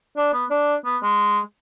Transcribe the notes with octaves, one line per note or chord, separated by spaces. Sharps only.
D4
B3
D4
B3
G#3